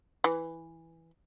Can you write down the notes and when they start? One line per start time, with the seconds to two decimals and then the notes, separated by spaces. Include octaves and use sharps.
0.24 E3